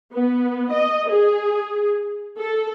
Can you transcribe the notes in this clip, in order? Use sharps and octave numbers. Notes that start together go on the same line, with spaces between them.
B3
D#5
G#4
A4